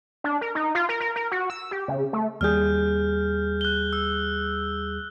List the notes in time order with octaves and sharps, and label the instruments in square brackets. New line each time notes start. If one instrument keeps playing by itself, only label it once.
[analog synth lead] D4
A#4
D#4
F4
A#4
A#4
A#4
F#4
E6
G4
C#3
A3
[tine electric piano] D#2 G3 G#4 [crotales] F6 G6
[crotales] F#6 G7
E6